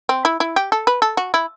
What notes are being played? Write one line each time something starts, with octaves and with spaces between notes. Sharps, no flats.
C4
E4
E4
G4
A4
B4
A4
F#4
E4